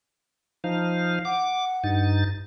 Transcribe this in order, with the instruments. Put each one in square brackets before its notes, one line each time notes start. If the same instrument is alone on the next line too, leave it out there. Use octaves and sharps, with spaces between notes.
[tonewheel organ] F3 D#4 F5
[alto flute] F#5 [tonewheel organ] D6
[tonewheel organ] G2 D#4 A6